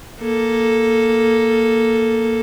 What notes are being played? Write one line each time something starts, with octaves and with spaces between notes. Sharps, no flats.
A#3 A4